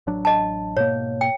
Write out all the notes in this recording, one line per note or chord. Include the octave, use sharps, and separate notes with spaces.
A1 F#3 D4
D#5 A5
G#2 B2 A#3 C#5
G5